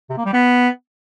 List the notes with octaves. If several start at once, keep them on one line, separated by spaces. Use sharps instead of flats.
C3
A#3
G3
B3